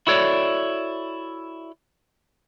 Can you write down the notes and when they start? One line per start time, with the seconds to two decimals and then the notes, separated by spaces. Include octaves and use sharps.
0.07 E4 F#4 A4 C#5 D5